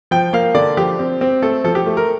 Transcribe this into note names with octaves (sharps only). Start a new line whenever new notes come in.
F3 G5
A#3 F5
D3 D5
F3 G4
C4
C4
A3 A4
F3 A4
G4
A3
A#4